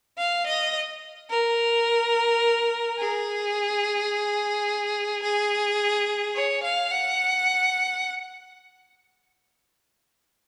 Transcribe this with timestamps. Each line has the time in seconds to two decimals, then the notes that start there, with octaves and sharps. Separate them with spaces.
0.18 F5
0.46 D#5
1.30 A#4
2.98 G#4
5.23 G#4
6.35 C#5
6.63 F5
6.91 F#5